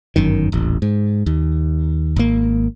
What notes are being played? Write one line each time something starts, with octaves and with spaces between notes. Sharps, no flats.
G1 F#2 D#3
D#1 A1
G#2
D#2
G#1 A#3